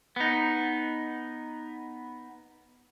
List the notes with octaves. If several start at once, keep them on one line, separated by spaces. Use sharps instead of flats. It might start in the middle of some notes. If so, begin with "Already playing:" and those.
B3 D#4